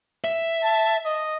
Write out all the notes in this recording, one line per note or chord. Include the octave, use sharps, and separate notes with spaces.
E5
A5
D#5